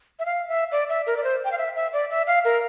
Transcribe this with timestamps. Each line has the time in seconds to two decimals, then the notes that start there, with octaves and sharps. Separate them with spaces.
0.19 E5
0.25 F5
0.48 E5
0.72 D5
0.89 E5
1.07 A#4
1.17 D5
1.24 C5
1.44 G5
1.52 F5
1.58 E5
1.76 E5
1.93 D5
2.10 E5
2.27 F5
2.45 A#4